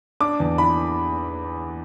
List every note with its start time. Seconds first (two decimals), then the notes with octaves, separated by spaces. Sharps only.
0.21 D4 D6
0.40 E2
0.58 E3 B5